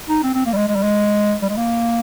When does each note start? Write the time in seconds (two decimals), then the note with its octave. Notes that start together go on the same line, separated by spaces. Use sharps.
0.09 D#4
0.23 C4
0.34 C4
0.46 A#3
0.53 G3
0.57 G#3
0.68 G#3
0.75 G3
0.83 G#3
1.41 G3
1.49 G#3
1.57 A#3